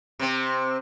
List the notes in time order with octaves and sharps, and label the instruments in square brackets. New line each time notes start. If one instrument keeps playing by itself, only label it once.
[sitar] C3 C4